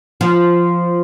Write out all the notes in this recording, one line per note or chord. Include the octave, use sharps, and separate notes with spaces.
F3